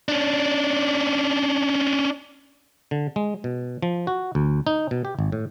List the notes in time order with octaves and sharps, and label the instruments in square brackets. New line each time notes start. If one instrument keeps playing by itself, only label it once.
[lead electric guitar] C#4 D4
[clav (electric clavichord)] D3
G#3
B2
F3
F#4
D2
D#4
B2
G4
G#1
A2